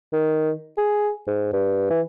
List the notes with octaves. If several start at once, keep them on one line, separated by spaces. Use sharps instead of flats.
D#3
G#4
G#2
G2
E3